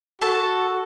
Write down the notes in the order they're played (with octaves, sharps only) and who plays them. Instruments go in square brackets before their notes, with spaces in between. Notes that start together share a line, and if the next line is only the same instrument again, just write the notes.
[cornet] F#4 [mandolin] A4 A5